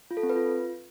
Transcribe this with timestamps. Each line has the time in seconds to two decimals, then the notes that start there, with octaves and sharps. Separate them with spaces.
0.11 F4
0.17 A4
0.23 C4
0.30 B4
0.36 F4